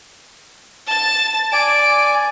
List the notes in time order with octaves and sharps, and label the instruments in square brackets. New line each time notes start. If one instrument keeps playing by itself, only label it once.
[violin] A5 A6
[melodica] D5 G#5 [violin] D7